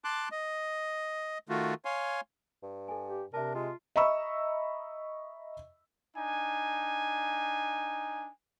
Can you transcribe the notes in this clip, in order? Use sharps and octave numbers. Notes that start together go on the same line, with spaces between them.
A5 C6 D6 F#6
D#5
D#3 A3 F4 F#4
C#5 F5 G#5 C6
G2
A4 G#5
G4
C3 D4 A#4 E5 A5
G#3 F4
D#5 E5 A#5 B5 C#6 E6
D4 D#4 G#5